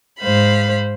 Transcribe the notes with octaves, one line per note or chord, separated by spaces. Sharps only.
G#2 C5 F5 B5